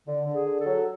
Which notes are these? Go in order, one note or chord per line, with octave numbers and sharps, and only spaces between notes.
D3
D3
G#4
D3
A4
F#3